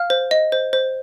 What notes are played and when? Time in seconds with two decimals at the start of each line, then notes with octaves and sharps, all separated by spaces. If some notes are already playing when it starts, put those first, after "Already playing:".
Already playing: F5 F6
0.10 C5
0.31 D#5
0.52 C5
0.73 C5